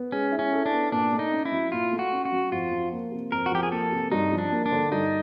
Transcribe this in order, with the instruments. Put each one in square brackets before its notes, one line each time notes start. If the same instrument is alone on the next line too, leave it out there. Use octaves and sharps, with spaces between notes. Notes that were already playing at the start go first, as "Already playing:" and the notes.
Already playing: [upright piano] B3
[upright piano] G#3 [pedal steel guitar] C#4
[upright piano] E4
[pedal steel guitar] C#4
[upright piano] A4
[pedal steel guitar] D4
[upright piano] B3
[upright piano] A#2 [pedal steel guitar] D4
[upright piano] A3
[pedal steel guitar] D#4
[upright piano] C#4
[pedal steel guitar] E4
[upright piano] F#3
[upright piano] A#2 [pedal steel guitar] F4
[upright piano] A3
[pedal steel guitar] F#4
[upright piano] C#4
[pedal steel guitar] F#4
[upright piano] F#3
[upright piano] F2 [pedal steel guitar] F4
[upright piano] F3
A#3
C3
[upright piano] F2 [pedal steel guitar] A#4
[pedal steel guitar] F#4
[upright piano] F3 [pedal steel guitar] G4
[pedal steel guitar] G#4
[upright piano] A#3 [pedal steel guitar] A4
[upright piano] C3
[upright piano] G2 [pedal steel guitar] D#4
[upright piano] F3
[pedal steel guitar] D4
[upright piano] A#3
[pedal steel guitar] D4
[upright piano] D3
[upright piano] G2 [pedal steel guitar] D#4